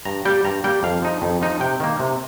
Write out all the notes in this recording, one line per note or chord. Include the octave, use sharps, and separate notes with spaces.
G2 A#5
G3 A#3 G5
G2 A#5
G3 A#3 G5
F2 F5
F3 D#4
F2
F3 D#4
C3 G5
D#3 A#3
C3